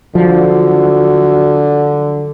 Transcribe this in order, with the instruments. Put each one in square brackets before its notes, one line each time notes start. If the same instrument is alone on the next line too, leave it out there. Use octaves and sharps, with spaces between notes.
[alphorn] D3 [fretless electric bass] F3 [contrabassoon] F#3